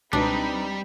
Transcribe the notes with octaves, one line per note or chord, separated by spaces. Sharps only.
C#2 B2 G3 C4 D4 D#4 B4